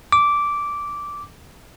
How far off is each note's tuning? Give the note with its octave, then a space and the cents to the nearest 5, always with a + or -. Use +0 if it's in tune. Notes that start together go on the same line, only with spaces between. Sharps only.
D6 -10